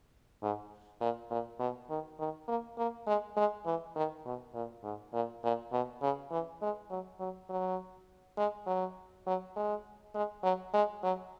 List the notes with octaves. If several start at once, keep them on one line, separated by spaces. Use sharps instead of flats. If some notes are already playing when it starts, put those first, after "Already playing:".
G#2
A#2
A#2
B2
D#3
D#3
A#3
A#3
G#3
G#3
E3
D#3
B2
A#2
G#2
A#2
A#2
B2
C#3
E3
G#3
F#3
F#3
F#3
G#3
F#3
F#3
G#3
G#3
F#3
G#3
F#3